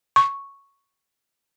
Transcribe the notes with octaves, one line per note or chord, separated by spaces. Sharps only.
C#6